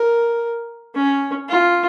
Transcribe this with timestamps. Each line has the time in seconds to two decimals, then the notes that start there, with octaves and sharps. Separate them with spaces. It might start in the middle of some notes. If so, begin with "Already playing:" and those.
Already playing: A#4
0.95 C#4
1.49 F4